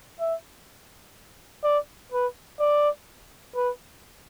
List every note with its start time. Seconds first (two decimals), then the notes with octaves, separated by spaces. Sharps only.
0.20 E5
1.64 D5
2.12 B4
2.60 D5
3.56 B4